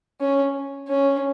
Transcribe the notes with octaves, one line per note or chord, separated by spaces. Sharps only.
C#4
C#4